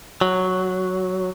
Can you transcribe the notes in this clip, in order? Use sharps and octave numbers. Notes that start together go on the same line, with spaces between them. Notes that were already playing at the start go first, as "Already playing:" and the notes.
F#3